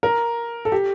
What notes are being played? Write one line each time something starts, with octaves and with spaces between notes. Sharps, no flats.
A#4
A4
G4